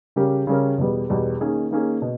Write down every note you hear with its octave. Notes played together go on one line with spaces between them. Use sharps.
C#3 G3 C#4 G4 A#4
C#3 G3 C#4 G4 A#4
E2 B2 G3 B3
E2 B2 G3 B3
D#3 A#3 C#4 G#4
D#3 A#3 C#4 G#4
B2